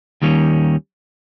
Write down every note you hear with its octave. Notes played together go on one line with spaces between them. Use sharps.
D#2 D#3 G3 A#3 C#4